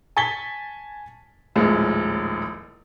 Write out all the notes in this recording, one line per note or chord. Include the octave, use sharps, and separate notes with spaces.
G#5 A5 C#6 A6 B6 G7
D#1 A1 F3 G#3